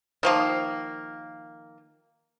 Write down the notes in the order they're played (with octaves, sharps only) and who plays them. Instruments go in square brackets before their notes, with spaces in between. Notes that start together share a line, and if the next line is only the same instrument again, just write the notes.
[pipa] D#3 F3 A#3